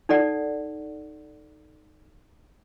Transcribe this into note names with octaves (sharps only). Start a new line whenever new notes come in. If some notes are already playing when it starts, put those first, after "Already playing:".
D#4 A4 D5 F#5